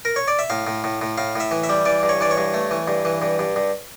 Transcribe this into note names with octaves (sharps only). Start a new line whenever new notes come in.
A#4
C#5
D5
E5
A2 F5
A2
A2
A2
A2 F5
A2 E5
E3
E5
G3
E3 D5
G2
C#5
E3 D5
C#5
G2
A3
E3
G2
E3
G2
G2
G2